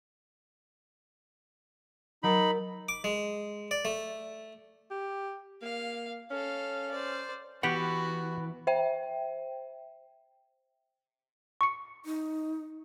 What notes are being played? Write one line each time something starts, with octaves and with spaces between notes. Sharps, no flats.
F#3 D#4 A#4 A5 B5
D6
G#3
D5
A3
G4
A#3 F5
C#4 A4 F5
C5 D5
E3 B3 F#4 G4 F#5
C5 E5 G5
C#6 C#7
D#4